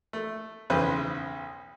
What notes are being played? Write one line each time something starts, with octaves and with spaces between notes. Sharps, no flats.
A3
B1 E2 C#3 B4 C5